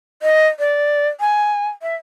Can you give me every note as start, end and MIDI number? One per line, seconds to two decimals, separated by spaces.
0.22 0.47 75
0.59 1.07 74
1.20 1.68 80
1.82 1.95 76